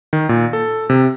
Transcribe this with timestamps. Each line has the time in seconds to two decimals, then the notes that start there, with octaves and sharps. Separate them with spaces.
0.13 D#3
0.29 A#2
0.53 A4
0.90 C3